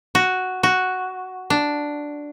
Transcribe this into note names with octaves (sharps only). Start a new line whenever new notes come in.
F#4
F#4
D4